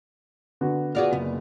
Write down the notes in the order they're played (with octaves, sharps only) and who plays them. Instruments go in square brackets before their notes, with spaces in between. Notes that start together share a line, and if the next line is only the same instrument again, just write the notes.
[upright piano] D3 B3 F#4
[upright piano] B3 F4 F#4 [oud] G#4 D5 F5
[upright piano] F#1 [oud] B3